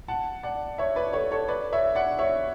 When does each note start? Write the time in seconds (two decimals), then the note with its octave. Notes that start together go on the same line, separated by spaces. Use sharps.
0.08 F#5 A5
0.43 D5 F#5
0.78 C#5 E5
0.96 B4 D5
1.13 A4 C#5
1.31 A4 C#5
1.48 B4 D5
1.72 C#5 E5
1.95 D5 F#5
2.19 C#5 E5